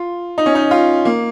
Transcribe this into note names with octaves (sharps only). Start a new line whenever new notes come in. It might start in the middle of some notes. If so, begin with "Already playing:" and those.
Already playing: F4
D#4
C#4
D#4
F4
A#3